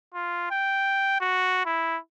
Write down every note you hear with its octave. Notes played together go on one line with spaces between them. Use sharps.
F4
G5
F#4
E4